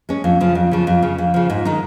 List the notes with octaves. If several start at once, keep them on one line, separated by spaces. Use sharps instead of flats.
G#3 C#4
F2
C#3 F3
F2
C#3 F3
F2
C#3 F3
F2
C#3 F3
G#2
D#3 G#3 D#4